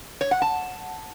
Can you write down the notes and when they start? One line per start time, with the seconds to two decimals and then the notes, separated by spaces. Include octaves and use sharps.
0.21 C#5
0.31 F#5
0.42 A5